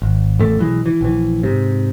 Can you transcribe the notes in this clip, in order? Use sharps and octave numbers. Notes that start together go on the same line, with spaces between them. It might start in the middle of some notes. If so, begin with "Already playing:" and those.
G#1
A1 E2 A3
B1 E3 G#3
E3
A#1 E3
G#2 C3